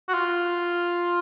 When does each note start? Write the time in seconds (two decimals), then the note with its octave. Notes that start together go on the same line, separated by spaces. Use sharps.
0.08 F#4
0.14 F4